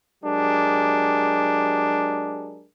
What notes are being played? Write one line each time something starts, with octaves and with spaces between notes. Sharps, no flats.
F#3 G#3 D4 G4 G#4 A#4